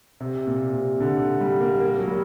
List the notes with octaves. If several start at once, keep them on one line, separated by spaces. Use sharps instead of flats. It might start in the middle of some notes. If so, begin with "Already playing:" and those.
C3
A#2
C3
D3
G3
A#3
A#3
F#3
G3